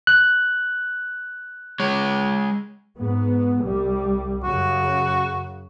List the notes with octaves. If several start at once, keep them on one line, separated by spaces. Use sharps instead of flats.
F#6
G#3 C#5
G#2 B3
C2 G3
F#2 C#3 F#4